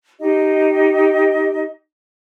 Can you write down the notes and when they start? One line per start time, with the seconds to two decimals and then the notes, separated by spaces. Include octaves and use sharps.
0.19 D#4 G4 D#5